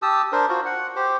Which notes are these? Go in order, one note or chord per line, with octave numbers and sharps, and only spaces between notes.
G4 A5 D#6 E6
D4 A#4 C5
F4 F#4 C5
F#5
G4 C5